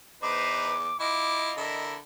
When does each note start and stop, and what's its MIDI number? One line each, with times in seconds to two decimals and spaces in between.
0.22 0.91 40
0.22 0.75 63
0.22 0.75 71
0.22 0.75 72
0.22 0.98 86
1.00 1.51 64
1.00 1.54 65
1.00 1.85 75
1.00 1.54 86
1.57 1.99 50
1.57 1.95 64
1.57 1.95 70